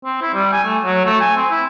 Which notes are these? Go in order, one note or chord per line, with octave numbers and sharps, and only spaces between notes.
C4
E4
G3
G#5
A3
F#3
A3
G#5
C4
E4